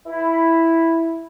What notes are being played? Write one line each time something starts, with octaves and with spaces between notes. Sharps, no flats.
E4